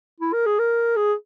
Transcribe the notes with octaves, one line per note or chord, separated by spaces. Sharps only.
E4
A#4
G#4
A#4
G#4